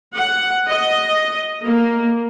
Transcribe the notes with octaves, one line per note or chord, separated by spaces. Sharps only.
F#5
D#5
A#3